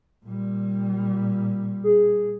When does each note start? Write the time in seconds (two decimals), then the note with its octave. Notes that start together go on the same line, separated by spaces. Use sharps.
0.25 A#2 G3
1.84 G#4